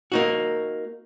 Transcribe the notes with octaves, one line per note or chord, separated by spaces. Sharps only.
A#3 D#4 F#4